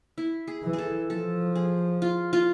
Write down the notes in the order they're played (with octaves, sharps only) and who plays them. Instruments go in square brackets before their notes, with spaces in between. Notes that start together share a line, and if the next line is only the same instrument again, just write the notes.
[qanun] E4
G#4
[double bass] E3
[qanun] G#4
A4
[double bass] F3 [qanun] A4
[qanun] G#4
F4
F4